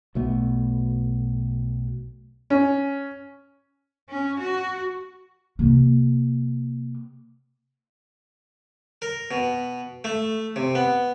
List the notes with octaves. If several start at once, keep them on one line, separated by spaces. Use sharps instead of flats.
B1 B2 A3 B3
C#4
C#4
F#4
C3 A#3
A#4
B2
A3
C3
B3